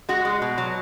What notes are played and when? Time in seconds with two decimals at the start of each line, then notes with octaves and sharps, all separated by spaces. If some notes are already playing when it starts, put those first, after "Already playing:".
0.09 G#3 F#4
0.25 G#3
0.42 B2
0.58 F#3